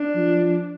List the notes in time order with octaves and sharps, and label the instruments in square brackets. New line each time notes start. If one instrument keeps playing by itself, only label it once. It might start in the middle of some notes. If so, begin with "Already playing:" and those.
Already playing: [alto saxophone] D4
[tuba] F3